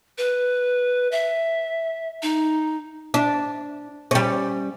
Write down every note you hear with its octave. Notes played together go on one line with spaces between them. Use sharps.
B4
E5
D#4
D4
G3 C#4